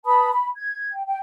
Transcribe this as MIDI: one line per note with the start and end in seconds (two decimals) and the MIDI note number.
0.06 0.31 71
0.06 0.31 81
0.06 0.31 83
0.06 0.31 87
0.32 0.48 83
0.57 0.91 92
0.92 1.06 79
1.07 1.20 79